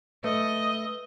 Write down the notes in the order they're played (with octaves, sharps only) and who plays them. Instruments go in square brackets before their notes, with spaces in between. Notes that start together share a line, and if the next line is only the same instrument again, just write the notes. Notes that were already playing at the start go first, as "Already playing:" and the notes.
[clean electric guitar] A3 [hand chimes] B4 [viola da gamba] D#5